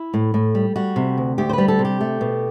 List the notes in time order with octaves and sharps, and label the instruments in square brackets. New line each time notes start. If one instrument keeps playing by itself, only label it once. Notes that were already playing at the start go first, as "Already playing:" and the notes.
Already playing: [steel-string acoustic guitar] E4
A2
A2
G3
G3 F#4
C3
D2
D2 G4
C5
G3 B4
A4
C3
G4
A3
B2